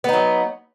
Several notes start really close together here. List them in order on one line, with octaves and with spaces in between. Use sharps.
B3 D#4 F#3